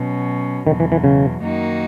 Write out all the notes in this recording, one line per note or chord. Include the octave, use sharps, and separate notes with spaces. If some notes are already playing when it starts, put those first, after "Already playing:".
Already playing: B2 F#3 C#4
E2 B2 D#3 F#3
E3
E3
C#3
F#2 D#3 A#3 D#4 F#4